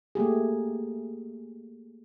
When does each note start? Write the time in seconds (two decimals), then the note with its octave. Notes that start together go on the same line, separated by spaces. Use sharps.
0.15 A3 A#3 G4 G#4